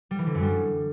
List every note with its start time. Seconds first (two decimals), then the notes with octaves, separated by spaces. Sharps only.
0.11 G3
0.19 E3
0.27 D3
0.35 F#2
0.42 G3